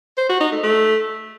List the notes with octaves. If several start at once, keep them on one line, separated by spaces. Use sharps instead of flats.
C5
F#4
D#4
A3
A3